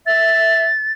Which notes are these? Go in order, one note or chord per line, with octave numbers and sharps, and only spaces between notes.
E5 A6